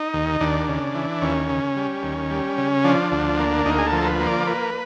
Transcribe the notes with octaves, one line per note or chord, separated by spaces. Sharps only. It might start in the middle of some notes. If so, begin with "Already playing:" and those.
Already playing: D#4
D#2
D#2 D4
C#3
E3
D#2 C#4
C#3
G3
D#2
G3
C#3
F3 D4
D2
A#3
D2 D#4
G#4
A4
F3
A#4
B4
A#3
D5
A#3 B4